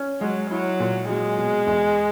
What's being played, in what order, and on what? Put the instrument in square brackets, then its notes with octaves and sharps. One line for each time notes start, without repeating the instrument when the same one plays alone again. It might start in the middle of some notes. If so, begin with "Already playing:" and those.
Already playing: [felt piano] C#4
[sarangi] F#3 [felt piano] G#3
[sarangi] F#3 [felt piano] E4
[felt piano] A#2
[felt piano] F#3 [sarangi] G#3
[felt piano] B2
E2